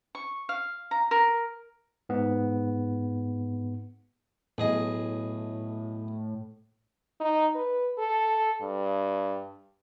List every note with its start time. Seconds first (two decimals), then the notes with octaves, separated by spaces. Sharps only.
0.15 C#6
0.49 F5
0.91 A#5
1.11 A#4
2.09 G#2 B3
4.58 B1 A2 G#4 D#5
7.20 D#4
7.55 B4
7.98 A4
8.61 G2